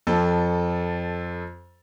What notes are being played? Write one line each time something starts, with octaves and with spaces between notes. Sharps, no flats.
F2 A4